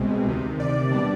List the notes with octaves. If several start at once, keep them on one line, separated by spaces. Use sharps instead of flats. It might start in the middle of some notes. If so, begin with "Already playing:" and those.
Already playing: C2 B2 G#3 C4
D2 C3 D#3
D5
B2 G3 B3 D4